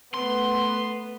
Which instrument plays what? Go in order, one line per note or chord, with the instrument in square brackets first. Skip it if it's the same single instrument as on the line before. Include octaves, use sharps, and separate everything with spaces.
[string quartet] A3 B3 [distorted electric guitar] C6